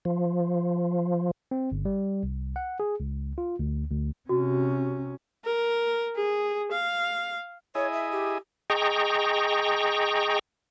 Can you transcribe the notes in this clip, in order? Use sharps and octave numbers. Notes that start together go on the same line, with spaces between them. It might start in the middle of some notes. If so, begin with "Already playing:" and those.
F3
C4
G1
G3
C2
F#5
G#4
C#2
F4
D2
D2
C3 C#4 F#4
A#4
G#4
F5
E4 G#4 C#5 D#5
E5
G4
G#4 D#5 G5 A#5 C#6